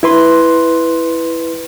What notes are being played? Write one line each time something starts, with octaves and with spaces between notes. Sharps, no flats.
E4 B4 C6